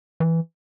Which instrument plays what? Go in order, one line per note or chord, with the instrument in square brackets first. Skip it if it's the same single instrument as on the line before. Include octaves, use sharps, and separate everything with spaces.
[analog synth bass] E3